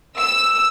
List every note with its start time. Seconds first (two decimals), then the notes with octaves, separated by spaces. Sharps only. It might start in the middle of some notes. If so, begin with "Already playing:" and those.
0.18 E6